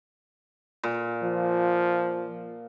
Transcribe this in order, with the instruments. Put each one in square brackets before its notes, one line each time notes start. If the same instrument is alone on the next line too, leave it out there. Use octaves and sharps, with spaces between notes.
[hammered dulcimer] A#2
[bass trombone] F3